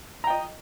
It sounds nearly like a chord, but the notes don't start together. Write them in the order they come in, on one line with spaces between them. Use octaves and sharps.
A#5 G5 D#5